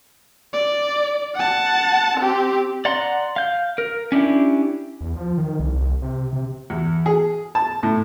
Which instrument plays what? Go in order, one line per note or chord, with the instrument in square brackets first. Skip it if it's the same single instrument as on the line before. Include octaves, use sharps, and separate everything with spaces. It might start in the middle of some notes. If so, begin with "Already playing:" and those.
[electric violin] D5
F#5 A5
C4 G4
[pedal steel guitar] D5 F#5 A#5 C6
F5 G6
A#4
C#4 D4 E4 G4
[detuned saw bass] E2
F3
D#3
C2
C2
C3
C3
[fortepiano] E2
G#4
A5
A2